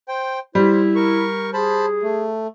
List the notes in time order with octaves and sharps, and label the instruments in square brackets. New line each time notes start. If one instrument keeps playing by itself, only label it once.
[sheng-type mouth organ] C5 G5
[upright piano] G3 [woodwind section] E4 [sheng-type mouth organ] C5
[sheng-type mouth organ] A#4 C#6
[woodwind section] G#4 [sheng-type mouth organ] C5 A5 B5
[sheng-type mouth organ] A3